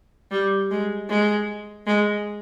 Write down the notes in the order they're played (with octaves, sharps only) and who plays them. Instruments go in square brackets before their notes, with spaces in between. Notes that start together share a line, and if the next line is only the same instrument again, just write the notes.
[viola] G3
G#3
G#3
G#3